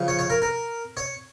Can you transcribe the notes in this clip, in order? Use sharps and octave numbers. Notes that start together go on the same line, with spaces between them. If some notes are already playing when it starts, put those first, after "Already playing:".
Already playing: C#3 F3
C#5
C#5
A#4
A#4
C#5